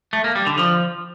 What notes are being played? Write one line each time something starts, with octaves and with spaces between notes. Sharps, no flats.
A3
A#3
G3
D3
F3